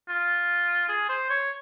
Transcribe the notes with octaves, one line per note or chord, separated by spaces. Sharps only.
F4
G#4
C5
C#5